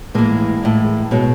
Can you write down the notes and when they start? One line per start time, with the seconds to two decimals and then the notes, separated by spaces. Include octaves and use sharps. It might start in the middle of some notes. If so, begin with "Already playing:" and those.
0.15 A2 E3 G#3 A#3
0.63 A2 E3
1.11 B2 F#3 G#3